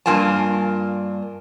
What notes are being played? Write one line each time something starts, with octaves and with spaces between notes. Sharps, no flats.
G2 A#3 F4 G#5 A5